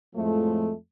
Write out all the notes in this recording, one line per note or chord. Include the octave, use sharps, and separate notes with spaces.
F2 A2 F3 G#3 A3